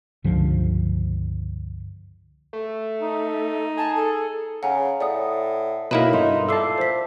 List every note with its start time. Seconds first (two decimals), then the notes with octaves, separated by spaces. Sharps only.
0.24 C#2 G2 D3 F3
2.53 A3
3.00 D#4
3.77 G#4 A5
3.95 A4
4.63 C#3 F#5 G#5 A#5
5.01 A2 D5 F#5 D#6
5.91 F#2 B2 A#3 D#4 E4 B4 B5 E7
6.13 G2 D#4 A4 C6
6.49 A#2 A4 E5 A5 D6 C7
6.78 C5 B6